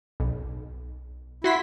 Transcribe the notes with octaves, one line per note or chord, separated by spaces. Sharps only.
B1
E4 F#4 C6 B6